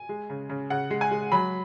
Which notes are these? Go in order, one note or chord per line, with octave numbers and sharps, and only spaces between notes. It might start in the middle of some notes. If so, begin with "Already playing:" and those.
Already playing: G#5
G#3
C#3
C#3
C#3 F#5
G#3
G#5
G#3
F#3 B5